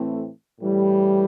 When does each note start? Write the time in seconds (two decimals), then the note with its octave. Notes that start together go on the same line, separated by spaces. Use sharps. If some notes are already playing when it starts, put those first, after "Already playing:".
Already playing: A2 E3 A3 C4
0.61 A2 E3 G3